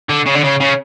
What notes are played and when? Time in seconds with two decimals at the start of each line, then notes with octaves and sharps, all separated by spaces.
0.09 D3
0.26 C#3
0.35 D3
0.44 C#3
0.60 C#3